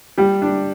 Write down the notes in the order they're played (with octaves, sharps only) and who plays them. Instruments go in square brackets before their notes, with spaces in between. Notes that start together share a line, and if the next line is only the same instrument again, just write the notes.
[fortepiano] G3 [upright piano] G4
[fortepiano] D4